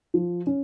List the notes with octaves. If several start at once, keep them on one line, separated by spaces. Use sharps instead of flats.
F3
C#4